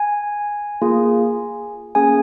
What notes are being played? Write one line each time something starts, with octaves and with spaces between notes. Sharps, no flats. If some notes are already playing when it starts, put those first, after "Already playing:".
Already playing: G#5
A#3 F4 G#4
A#3 C#4 G#4 G#5